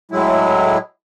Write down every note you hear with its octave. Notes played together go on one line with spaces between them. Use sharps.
A2 F#3 G#3 E4